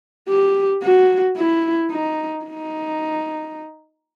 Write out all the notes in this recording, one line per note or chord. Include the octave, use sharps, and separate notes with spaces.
G4
F#4
E4
D#4
D#4